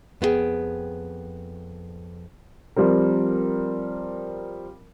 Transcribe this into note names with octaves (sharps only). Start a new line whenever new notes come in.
F2 B3 F4 G#4 G5
F3 G3 C4 A#4